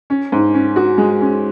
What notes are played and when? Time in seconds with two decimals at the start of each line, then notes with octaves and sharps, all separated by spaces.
0.10 C#4
0.32 G#2
0.54 C#4
0.76 F#4
0.98 G#3
1.21 C#4